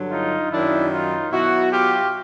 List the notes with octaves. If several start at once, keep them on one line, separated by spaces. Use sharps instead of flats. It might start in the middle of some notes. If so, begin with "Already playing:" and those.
Already playing: G2 D3 F#3
D#4 F4
F#2 D#3 F#3 D4 E4
D#4 F4
B2 F#3 E4 F#4
F4 G4